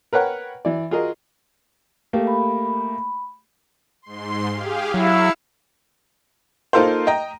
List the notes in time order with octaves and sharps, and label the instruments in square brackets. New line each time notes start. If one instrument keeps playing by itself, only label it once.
[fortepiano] A#4 B4 C#5 F#5 G5
E3 D5
F4 F#4 G#4 A#4 D#5
[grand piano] A3 A#3 G4
[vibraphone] B5
[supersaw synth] G#2 C6
G4 G#4 F5
[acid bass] F#3 [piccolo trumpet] E4 [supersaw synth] F5 E6 C#7
[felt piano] A#3 D#4 F4 A4 A#4 C5
D#5 G5 A#5